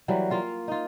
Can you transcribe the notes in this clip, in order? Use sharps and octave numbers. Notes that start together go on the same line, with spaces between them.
E3 F#3 G3 A#3
A#3 F4 F5
D#4 F4